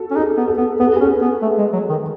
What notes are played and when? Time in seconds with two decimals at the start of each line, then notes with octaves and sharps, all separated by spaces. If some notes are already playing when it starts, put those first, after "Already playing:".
Already playing: F#4 A4
0.11 C#4
0.16 D#4 G#4
0.38 B3
0.48 A4
0.58 B3
0.80 B3 B4
0.87 A4
0.96 G#4
1.00 C#4
1.04 A4
1.22 B3
1.42 A3
1.59 G#3
1.73 F#3
1.89 D#3